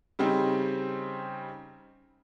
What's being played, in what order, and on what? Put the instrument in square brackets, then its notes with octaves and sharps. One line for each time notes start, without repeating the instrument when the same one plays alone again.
[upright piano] C#3 G3 C4 D#4